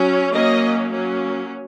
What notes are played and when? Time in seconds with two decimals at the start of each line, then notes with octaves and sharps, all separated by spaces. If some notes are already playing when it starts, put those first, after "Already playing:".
Already playing: F#3 C#4
0.32 F#3 A#3 C#4 D#5
0.91 F#3 A#3 C#4